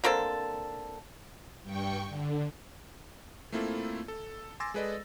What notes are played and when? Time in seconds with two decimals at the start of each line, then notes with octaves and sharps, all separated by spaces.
0.04 D3 A#3 C4 A4
1.63 G2 G5 C#6
2.09 D3
3.52 A3 A#3 C4 E4 F4 A4
4.08 A4
4.60 G#5 C6 D6 E6 A6 A#6
4.74 G#3 G#4 A4 B4 D5 D#5